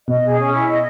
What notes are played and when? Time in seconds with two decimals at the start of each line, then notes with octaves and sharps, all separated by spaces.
0.08 B2 D#5
0.23 G#4
0.38 C#4
0.54 E4
0.68 D#5